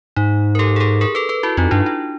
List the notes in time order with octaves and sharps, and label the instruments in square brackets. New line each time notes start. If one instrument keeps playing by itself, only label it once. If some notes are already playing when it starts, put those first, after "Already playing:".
[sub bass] G#2 [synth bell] D#4
[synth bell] A#4
G4 A4
G#4
G4 A4
G#4 A#4
A4 B4
A4 B4
E4 F#4
[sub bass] F2 [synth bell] D#4 F4
[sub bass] G2 [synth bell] D4 E4
[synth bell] D4